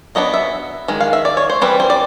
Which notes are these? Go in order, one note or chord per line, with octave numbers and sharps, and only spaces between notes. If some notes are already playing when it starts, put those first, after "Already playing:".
F#3 B3 D4 D#5
E5
D#3 G#3
F5
E5
D5
C#5
C5
E3 G3 C4 B4
C5
D5